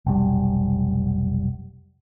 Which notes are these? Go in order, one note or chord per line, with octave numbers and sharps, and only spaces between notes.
F1 B1 G3